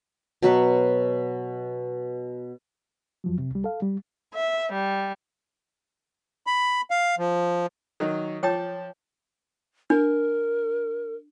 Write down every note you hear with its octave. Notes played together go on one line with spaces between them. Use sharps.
B2 F#3 B4
F2 F3 F#3
C3
C2 G3
A4 F5
G3
E5
G3
B5
F5
F3
D#3 F#3 D#4
F3 C#5 G5 A5 D6
D4 A#4